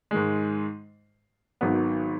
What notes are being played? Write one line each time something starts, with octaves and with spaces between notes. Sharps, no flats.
G#2 D#3 G#3
G#1 G#2 D#3 F#3 B3